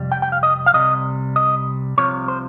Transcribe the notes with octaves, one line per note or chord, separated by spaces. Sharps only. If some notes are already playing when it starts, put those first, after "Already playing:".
Already playing: F2 C3 G3
G5
G5
F5
D#5
F5
C2 C3 G3 D#5
D#5
C2 C3 F3 C#5
C5